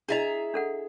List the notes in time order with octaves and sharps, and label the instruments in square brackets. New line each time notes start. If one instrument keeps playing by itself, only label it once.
[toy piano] D4 E4 D#5 [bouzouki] G#4 E5 A#5
[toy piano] D4 A4 F#5